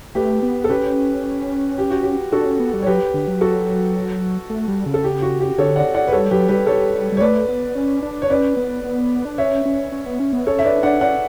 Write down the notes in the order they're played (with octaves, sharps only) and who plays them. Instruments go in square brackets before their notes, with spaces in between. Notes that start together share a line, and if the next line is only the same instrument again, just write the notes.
[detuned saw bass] A3 [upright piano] G4 B4
[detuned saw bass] B3
[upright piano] A4
[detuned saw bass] C#4 [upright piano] G4 B4
[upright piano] G4
F#4
G4
[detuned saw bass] D4 [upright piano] F#4 A4
[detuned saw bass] C#4
B3
G3
[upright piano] C#5
[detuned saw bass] F#3 [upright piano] G4 B4
[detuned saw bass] D3
F#3
[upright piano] F#4 A4
[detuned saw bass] A3
G3
C#3
[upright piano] A4
G4
F#4
G4
[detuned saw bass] D3 [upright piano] A4 C#5
[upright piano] D5 F#5
D5 F#5
B4
[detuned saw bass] G3 [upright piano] A4 C#5
[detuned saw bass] F#3 [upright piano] G4 B4
[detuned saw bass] G3 [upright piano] G4 B4
[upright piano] A4 C#5
[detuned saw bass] G3
[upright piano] C#5
[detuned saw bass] A3 [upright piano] B4 D5
[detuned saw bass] B3
C#4
D4
[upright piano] C#5
[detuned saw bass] C#4 [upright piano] B4 D5
[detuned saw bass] B3
B3
D4
[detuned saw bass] C#4 [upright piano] C#5 E5
[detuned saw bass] C#4
C#4
B3
C#4
B3
[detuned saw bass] C#4 [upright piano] A4 C#5
[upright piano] E5
[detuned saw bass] D4 [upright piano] B4 D5
[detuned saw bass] D4 [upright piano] D5 F#5
[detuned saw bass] C#4 [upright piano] D5 F#5